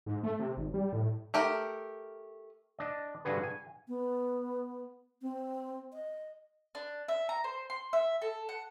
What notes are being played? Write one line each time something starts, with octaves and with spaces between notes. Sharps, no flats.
G#2
A3
C3
G#1
G3
A2
A3 G4 A#4
D4 D#5
G2 D3 F#4 G#4 B4
G#5
B3
C4
D#5
D4
E5
A#5
C5
C6
E5
A4
F#5